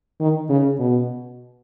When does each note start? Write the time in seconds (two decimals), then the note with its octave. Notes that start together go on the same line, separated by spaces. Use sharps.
0.20 D#3
0.49 C#3
0.79 B2